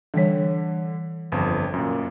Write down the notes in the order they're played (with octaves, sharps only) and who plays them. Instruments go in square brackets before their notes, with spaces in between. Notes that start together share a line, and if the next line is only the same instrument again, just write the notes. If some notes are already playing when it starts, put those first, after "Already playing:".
[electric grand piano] D3 B6 [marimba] E3 G3 C#5
[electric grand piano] G1 F2
F#2 A#2